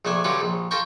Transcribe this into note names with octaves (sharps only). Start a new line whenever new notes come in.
A#1 A3 D4 G#5
D3 F#3 G3 C#4 F4 B4
A#1
F4 A4 A#4 G5 C#6